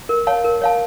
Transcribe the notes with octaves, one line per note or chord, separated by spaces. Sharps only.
A#4
C#5 F5 A5
A#4
C#5 F5 A5